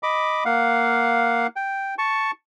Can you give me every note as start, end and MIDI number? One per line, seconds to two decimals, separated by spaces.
0.03 0.44 75
0.03 0.44 83
0.03 0.44 86
0.45 1.47 58
0.45 1.47 77
0.45 1.47 78
1.56 1.95 79
1.98 2.31 81
1.98 2.31 85